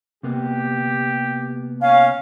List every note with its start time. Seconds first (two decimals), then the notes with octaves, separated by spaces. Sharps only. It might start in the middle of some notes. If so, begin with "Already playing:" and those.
0.23 C3 A#3 B3 G4
1.82 C#4 F5